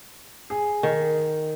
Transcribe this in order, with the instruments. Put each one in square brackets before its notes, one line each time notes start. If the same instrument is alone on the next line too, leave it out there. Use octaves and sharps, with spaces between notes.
[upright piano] G#4
[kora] D#3